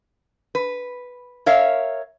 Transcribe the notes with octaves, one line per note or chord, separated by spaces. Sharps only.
B4
A#4 C#5 E5 F5